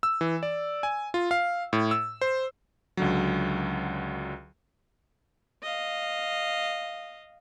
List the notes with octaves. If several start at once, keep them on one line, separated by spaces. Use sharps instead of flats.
E6
E3
D5
G#5
F4
F5
A2
E6
C5
C#2 D3 F#3
D#5 F5